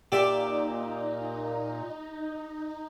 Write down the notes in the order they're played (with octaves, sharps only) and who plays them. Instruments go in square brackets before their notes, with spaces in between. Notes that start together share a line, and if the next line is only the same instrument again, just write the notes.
[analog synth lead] A#2 [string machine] D#4 [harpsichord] G4 D5 E5